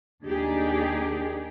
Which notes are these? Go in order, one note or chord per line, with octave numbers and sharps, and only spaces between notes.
D#2 D4 D#4 G4 G#4